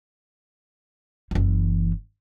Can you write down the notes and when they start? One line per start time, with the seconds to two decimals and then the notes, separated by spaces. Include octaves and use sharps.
1.31 F#1 E3